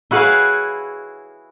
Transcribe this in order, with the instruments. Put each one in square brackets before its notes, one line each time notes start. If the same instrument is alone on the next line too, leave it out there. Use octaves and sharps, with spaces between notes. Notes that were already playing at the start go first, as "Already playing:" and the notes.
[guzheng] E4 F#4 G#4 B4 C#5 F5